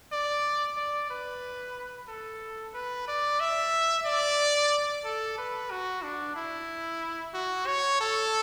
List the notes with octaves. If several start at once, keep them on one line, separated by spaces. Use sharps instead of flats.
D5
D5
B4
A4
B4
D5
E5
D5
A4
B4
F#4
D4
E4
F#4
C#5
A4